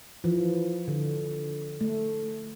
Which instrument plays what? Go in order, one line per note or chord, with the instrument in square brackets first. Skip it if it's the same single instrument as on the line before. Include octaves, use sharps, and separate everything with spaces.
[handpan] E3 F3
D3
A3